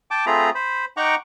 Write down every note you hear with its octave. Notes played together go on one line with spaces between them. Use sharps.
G5 A5 D6
A3 C4 F4 G#4 A#5 B5
C5 B5
D#4 F#5 G5 A#5 C#6 D6